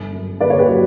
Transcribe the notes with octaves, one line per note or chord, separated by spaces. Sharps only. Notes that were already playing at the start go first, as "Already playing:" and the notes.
Already playing: G1
F#2
D3 B4 D5
C#5
G4 B4
F#3